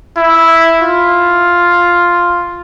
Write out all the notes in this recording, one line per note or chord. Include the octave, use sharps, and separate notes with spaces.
E4
F4